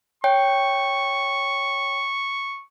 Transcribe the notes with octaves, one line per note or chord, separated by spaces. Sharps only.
C#5 G5 C#6